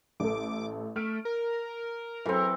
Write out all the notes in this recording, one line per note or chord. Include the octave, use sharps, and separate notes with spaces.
A1 A4 D6
A3 F6 D7
A#4
E3 F#3 C4 A4 C#7